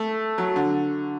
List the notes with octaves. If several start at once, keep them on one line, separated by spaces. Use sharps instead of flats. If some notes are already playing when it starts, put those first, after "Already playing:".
Already playing: A3
F#3
D3